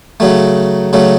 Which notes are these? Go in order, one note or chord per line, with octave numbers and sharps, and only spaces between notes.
C#3 F#3 A3
C#3 F#3 A3